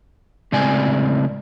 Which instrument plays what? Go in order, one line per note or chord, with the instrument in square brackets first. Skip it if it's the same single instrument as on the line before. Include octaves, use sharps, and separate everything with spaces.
[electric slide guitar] A2 C#3 G#3 C4 D5 G#5